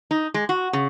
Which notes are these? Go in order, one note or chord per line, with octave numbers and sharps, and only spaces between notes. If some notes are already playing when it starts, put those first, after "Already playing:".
D#4
G#3
F#4
C#3